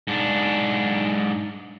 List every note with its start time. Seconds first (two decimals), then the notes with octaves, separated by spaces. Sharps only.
0.07 G#2 D4